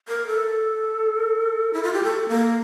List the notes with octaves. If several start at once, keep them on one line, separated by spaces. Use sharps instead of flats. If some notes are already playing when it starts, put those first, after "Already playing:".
A#4
A4
E4
F4
G4
A4
A#3